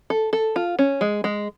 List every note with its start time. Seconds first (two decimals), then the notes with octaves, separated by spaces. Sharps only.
0.10 A4
0.33 A4
0.56 F4
0.79 C#4
1.01 G#3
1.24 G#3